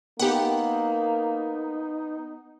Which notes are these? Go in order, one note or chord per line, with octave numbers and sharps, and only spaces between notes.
A#3 B3 D#4 G4 F#5